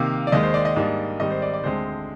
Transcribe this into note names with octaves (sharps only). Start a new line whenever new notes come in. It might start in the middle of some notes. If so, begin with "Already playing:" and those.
Already playing: C3 D#3 A#3 F5
D5
D#2 D#3 G#3 D#5
C5
D5
D#5
G#2 G3 A#3 D4
G#2 D#3 G3 C4 D#5
C5
D5
D5
D2 D3 G#3 C4 C5